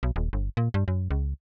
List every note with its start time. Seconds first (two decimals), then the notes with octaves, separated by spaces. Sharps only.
0.03 B1
0.16 D#1
0.33 G1
0.57 A#2
0.74 G2
0.88 F#2
1.11 C#2